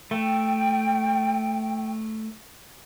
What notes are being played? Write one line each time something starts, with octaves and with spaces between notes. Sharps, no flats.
A3 G5